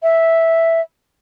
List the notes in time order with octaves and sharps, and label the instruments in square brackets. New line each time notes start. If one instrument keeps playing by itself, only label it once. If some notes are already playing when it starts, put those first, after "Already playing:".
[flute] E5